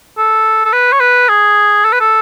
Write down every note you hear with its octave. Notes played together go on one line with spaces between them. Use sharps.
A4
A4
B4
C#5
B4
G#4
A4
B4
A4